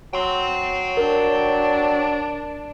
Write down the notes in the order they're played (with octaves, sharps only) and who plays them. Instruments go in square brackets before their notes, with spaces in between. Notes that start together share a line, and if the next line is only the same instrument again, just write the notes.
[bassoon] F#3 [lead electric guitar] G5 C6
[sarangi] D4 [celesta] A#4